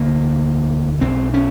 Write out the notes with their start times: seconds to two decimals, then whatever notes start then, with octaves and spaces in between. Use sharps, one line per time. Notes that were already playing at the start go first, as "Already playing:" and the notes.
Already playing: E1 D2 D3 A#3
1.01 B1 B2 C4
1.34 C#4